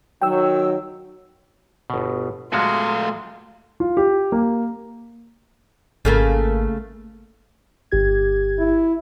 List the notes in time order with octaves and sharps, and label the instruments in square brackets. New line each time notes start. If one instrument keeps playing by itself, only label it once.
[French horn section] D#3 F#3 [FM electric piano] G5 E6
[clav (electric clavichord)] G1 B2
[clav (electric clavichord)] A#2 G#3 F#4 [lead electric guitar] A3 F5 [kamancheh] C6
[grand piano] F4
G4
A#3
[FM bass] G#1 [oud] C#3 A3 A#3
[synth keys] G1 G4 G#6
[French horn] E4